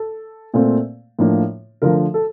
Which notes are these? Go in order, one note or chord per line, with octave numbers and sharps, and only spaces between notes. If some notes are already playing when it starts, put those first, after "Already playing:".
Already playing: A4
A#2 A3 C4
A2 F3 A#3 D4
D3 F3 A3 A#4
A4